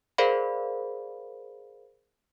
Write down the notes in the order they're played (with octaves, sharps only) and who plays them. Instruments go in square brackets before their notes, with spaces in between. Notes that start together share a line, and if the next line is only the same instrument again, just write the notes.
[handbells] G#4 A#4 C5 D5 F5 B5